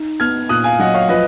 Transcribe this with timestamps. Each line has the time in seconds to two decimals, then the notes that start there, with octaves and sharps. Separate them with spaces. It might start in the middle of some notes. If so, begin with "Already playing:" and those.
Already playing: D#4
0.20 B3 F6 G#6
0.49 A#2 D#6 F#6
0.64 F5 G#5
0.79 F#3 D#5 F#5
0.94 C#5 F5
1.09 F3 B4 D#5